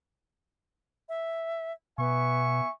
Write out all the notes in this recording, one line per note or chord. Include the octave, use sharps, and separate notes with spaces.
E5
B2 B3 E5 G#5 C#6